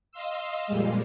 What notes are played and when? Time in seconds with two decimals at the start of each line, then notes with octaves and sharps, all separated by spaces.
0.12 D#5 F5 C6 E6
0.67 F2 A#2 G3 G#3